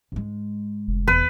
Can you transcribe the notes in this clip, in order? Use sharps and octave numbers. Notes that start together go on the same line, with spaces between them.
G#2 G#3
F1
E2 B4